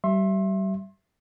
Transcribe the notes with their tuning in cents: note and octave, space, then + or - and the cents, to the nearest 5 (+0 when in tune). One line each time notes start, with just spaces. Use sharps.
G3 -30 E5 +15 C6 +30